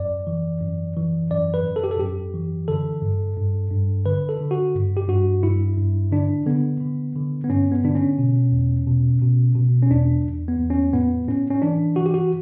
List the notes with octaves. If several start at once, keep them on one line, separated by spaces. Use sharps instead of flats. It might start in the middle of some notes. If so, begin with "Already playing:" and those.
Already playing: F#2 D5
E3
F#2
E3
F#2 D5
B4
F#2
A4
G4
A4
F#2 G4
E3
D3 A4
G2
G2
G2
D3 B4
A4
D3
F#4
G2
G4
G2 F#4
G2 E4
G2
D3 D4
D3 B3
D3
D3
B3
G2 C#4
B3
D3 D4
C#4
B2
E2
B2
B2
B2
C#4
E2 D4
E2
B3
E2
C#4
A2 B3
A2 C#4
C#4
E3 D4
E3 F#4
G4
F#4